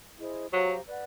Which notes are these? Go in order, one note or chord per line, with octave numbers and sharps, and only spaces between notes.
E4 G#4 C5 D#5
F#3 G4 C5 F5 A#5
B4 D5 F#5